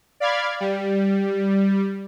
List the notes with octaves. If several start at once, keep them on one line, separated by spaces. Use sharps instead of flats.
D5 F5 B5 D6 F6 G#6
G3